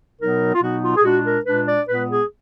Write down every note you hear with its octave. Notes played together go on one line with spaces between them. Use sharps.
B2 F#3 B3 D#4 A#4
F4
B2 F#3 B3 D#4 F#4
F4
G#4
A#2 G#3 D4 F#4
A#4
A#2 G#3 D4 B4
D5
A#2 G#3 B3 B4
G#4